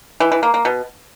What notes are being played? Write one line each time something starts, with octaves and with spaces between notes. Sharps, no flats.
E3
E3
A#3
A#3
B2